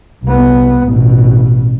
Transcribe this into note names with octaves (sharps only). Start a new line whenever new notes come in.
C2 B3
A1 B2